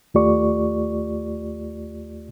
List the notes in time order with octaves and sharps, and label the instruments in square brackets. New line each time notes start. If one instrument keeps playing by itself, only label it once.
[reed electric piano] D#2 A3 F4 G4 D5 C#6